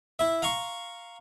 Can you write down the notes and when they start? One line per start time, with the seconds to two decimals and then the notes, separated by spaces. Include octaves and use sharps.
0.19 E4 E5
0.42 F5 A#5 C6 C#6